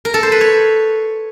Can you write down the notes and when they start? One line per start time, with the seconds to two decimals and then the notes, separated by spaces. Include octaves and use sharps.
0.05 A#4
0.14 A4
0.23 C5
0.32 B4
0.41 C#5